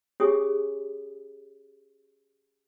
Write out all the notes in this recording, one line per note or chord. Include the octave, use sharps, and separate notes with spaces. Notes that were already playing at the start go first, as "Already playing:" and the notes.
C#4 G4 G#4 C#5 G#5 D#6